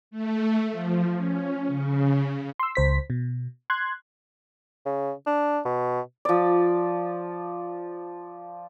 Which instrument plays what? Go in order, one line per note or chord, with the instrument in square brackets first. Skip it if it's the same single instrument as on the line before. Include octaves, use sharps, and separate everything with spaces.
[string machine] A3
F3
C#4
C#3
[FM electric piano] C6 E6
C#2 C5 B6
B2
C6 F#6 G#6
[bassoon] C#3
D4
B2
[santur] F3 D5